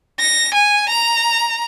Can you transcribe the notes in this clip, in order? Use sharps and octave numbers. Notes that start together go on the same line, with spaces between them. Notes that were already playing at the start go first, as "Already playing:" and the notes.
A#6
G#5
A#5